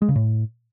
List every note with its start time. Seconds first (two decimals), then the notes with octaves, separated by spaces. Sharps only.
0.02 G#3
0.09 C#3
0.15 A2